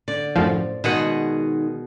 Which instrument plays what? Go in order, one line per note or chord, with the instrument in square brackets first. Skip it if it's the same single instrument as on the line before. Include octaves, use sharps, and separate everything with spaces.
[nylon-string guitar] D3 [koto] D5
[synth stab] F#2 A2 F3
[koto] B2 G#4 F#5 [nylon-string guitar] D#3 G#3